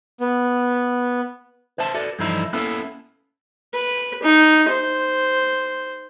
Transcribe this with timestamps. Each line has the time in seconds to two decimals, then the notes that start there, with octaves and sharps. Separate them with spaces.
0.20 B3
1.78 B4 C5 E5 A5
1.94 F#4 A4 B4 D5
2.19 G2 D3 E3 F3 D#4 E4
2.53 A#3 B3 C#4 E4 A4
3.74 B4
4.23 D#4
4.69 C5